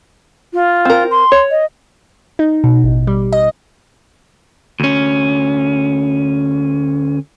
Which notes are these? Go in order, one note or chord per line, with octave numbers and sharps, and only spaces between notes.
F4
C4 A#4
C6
C#5
D#5
D#4
B2
A1
G3
D#5
D2 C#4